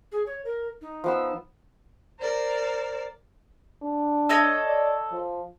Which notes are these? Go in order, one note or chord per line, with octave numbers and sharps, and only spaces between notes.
G#4
C#5
A#4
D#4
F3 B3 E6
A#4 C5 D5
D4
A4 C#5 D#5
D5
F3